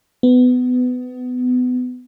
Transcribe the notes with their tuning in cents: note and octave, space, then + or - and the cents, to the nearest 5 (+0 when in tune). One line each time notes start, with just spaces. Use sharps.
B3 +20